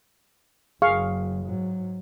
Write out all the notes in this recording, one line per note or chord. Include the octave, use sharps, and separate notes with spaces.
F#1 F#3 G#4 F5 C#6
G#2 F#3